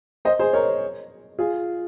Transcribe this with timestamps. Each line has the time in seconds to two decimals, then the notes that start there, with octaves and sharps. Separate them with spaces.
0.25 C5 D#5
0.39 G#4 C5
0.53 A#4 C#5
1.39 F4 G#4